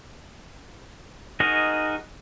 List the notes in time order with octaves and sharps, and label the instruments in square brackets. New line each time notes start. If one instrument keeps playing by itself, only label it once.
[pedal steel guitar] D#4 F#4 G#4 A#4 D#5